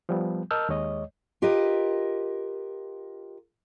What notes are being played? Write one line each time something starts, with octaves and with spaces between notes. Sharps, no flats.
F3 G3 B3
A#4 D#5 A5 E6 F6 G6
D#2 G#3 C#5 D#5
F4 G4 A#4 B4 D#5